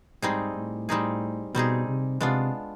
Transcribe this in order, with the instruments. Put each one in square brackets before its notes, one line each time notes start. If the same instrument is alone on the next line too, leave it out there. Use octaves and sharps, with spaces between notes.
[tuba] G#2 [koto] G3 C4 D#4 G#4
[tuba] A2
[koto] G3 C4 D#4 G#4
[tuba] B2 [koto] G3 C4 D#4 G#4
[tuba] C3
[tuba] C3 [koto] G#3 B3 D4 F4